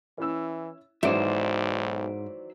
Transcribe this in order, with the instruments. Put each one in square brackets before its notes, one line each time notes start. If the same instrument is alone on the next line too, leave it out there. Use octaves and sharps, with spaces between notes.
[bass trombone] E3 [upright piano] C#4 E4 E6
[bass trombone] B1 [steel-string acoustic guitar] G#2 [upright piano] D#3 E3 F#3 [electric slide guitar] C5 D5 E5